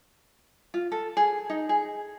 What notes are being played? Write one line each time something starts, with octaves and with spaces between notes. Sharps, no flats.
F4
A4
G#4
D#4
G#4